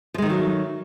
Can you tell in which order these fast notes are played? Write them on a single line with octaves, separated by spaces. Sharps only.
F3 G#3 D#3 A3 F#3